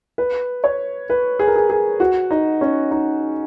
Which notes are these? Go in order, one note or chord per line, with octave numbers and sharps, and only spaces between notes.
B4
C#5
B4
G#4
A#4
G#4
G#4
F#4
D#4
C#4
D#4